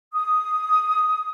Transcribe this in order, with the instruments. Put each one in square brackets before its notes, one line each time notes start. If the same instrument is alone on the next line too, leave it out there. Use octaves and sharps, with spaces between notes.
[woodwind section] D#6